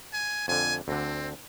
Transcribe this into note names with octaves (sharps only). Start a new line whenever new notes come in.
G#5
F2 D3 G#5
D2 D3 C4